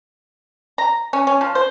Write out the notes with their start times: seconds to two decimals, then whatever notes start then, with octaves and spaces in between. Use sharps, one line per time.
0.78 A#5
1.13 C#4
1.27 C#4
1.41 F3
1.55 C5